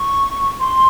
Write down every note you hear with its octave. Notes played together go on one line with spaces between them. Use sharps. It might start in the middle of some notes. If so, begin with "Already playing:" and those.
Already playing: C#6
C6